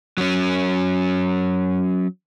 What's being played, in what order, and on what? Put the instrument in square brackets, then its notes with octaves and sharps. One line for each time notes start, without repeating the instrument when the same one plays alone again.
[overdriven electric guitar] F#3 C#4